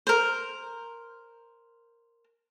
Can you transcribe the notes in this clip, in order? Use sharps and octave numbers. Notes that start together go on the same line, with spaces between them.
A#4 C5